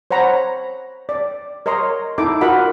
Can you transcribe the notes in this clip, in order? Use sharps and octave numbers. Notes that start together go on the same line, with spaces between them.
C5 C#5 F#5 A#5 B5
D5
A#4 C#5 D#5 A#5 C6
D#4 E4 A4 D6
F4 F#4 A#4 D#5 F#5 B5